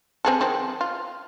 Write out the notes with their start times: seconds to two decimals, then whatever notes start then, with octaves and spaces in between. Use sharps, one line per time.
0.25 C4 G#4 A4
0.41 D#3 F3 C4
0.81 F4